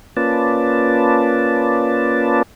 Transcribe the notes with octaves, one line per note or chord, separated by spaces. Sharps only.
A#3 C#4 F4 B4 D5 A5